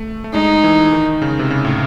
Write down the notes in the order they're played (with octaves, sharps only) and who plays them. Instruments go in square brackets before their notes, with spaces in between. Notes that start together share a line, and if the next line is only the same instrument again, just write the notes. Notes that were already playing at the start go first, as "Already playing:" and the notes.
Already playing: [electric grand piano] A3
A3
[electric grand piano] G#3 [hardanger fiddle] D#4
[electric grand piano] E3
D#3
C#3
C3
C#3
A2